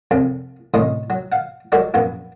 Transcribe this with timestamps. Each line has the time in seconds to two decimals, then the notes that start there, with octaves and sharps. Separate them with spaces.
0.11 C2 F2 C3
0.74 D2 A2 C3 C#4 D#5 C6
1.10 F#3
1.32 F5 F#5
1.72 F#3 G#3 F#4 A4 A#4 D5
1.94 A#1 F#2 A#3 B3